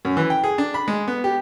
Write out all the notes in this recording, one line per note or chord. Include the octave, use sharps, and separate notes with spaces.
F#2
E3
G5
G#4
D4
B5
G#3
B3
G4